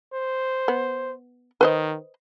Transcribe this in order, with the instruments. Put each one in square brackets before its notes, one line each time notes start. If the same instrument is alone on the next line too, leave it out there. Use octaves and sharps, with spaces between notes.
[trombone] C5
[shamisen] B3
[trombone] D#3 [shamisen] B4 C5 D#5